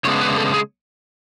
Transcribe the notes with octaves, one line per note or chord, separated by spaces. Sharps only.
C#3 G#3 B3 D4 C#5
B4
A4
G#4